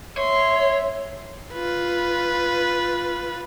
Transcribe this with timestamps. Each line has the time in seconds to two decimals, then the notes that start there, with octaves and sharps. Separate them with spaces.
0.18 C#5 E5 C6
1.53 F4 B4